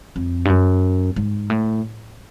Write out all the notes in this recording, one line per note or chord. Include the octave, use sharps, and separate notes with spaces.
F2
G2
F#2
G#2
A2